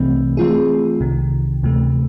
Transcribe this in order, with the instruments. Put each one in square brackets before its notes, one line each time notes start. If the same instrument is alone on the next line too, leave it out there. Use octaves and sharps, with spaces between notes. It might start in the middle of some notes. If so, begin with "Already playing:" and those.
Already playing: [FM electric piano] C2 C3 E3 A3 C4
E3 A3 C4 F4 G#4
C2 C3 D#3
D2 C3 E3 A3